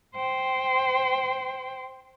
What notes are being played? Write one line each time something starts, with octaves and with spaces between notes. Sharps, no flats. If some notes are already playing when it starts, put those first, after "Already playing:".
C5 G5